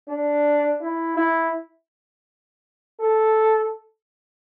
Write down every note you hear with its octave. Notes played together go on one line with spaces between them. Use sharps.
D4
E4
E4
A4